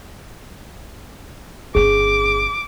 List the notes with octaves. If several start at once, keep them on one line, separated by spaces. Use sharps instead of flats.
G1 C#4 G#4 D6